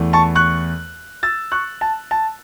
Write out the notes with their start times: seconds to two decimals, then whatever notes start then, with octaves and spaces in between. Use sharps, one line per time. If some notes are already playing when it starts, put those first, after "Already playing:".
Already playing: E2 E3 A3
0.13 A5 C#6
0.35 C#6 F#6
1.23 E6 A6
1.52 C#6 F#6
1.81 A5
2.11 A5